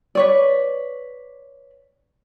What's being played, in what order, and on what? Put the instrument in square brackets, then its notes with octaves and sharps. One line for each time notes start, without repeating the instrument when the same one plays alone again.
[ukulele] B4 C#5 D5